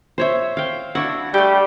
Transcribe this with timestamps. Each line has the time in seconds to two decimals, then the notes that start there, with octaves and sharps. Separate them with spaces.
0.18 C5 C#5 E5
0.57 F5 G5
0.95 D4 E4 F#4 F#5 E6
1.34 G3 A3 G4